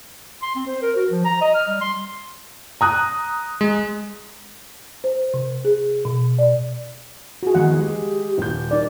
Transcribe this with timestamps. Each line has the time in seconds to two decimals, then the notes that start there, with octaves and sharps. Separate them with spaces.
0.42 C6
0.55 C4
0.67 C5
0.82 A#4
0.96 F#4
1.10 F3
1.25 A#5
1.41 D#5
1.55 F6
1.68 G3
1.81 C6
2.81 A#5 D#6 F#6
3.61 G#3
5.04 C5
5.34 C3
5.65 G#4
6.05 B2
6.39 D5
7.43 F#4 G#4
7.54 E2 D#3 G#3 F#5
7.79 G#3 G4
8.38 D#1 G6
8.71 D#4 A#4 D5